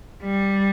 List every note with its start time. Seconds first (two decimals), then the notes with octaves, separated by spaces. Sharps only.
0.23 G3